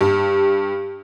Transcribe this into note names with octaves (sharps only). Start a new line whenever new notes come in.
G2